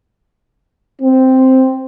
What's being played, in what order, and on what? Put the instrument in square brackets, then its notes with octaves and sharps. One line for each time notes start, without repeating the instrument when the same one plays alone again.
[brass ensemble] C4